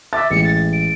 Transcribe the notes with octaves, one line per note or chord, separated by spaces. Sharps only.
E5 D6 A6
A1 G#3 C#7
A6
D7